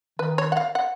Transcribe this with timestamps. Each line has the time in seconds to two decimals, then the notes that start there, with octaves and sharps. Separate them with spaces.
0.19 D#3 B4
0.38 C#5
0.52 F#5
0.57 F5
0.75 F#5